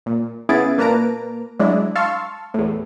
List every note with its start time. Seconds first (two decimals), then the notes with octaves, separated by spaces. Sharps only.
0.06 A#2
0.49 C#3 B3 E4 G#4 A6 D7
0.78 A#2 A#3 B4 A5 A#5 D7
1.59 F#3 G#3 D4 E4
1.95 F5 A5 C6 C#6 E6 F6
2.54 E2 A2